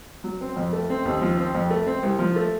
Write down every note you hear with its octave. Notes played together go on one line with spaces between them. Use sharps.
F#3
C4
F2
A3
C4
D#2
F3
C4
F2
A3
C4
C2
F3
A3